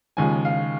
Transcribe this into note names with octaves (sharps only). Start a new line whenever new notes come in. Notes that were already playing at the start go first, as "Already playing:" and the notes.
D#2 C#3 F3 G#3 G#5
F5